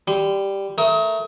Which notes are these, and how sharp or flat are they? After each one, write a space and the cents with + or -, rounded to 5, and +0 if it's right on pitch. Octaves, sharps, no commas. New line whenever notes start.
G3 +0 C6 -40
A3 +0 A#4 +0 D#6 +35